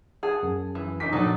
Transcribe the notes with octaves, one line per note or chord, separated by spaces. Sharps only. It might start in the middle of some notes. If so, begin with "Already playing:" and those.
G#4 F#5 A5 D#6
F#2
E3
D#4 C#6 D6 B6
A#2 F3 F#3 D4 D#4 A4 D5